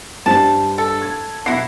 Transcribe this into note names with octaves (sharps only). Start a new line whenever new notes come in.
G2 G3 C5 A5
A4
G#6
B2 F#3 E4 A#6 C7